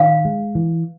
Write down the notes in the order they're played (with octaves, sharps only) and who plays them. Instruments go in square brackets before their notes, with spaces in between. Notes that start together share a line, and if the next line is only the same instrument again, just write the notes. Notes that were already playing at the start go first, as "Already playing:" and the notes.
Already playing: [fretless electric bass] D#3 [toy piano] F5
[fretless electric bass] G#3
E3